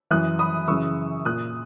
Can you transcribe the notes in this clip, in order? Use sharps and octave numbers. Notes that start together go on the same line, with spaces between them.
F#2 E3 D#6 F#6
B5 D#6
F#2 C#3 E3 C#6 E6
A#2 D#6 F#6